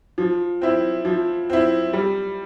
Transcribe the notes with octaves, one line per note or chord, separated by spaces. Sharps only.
F3
C4 E4
F3
C4 E4
G3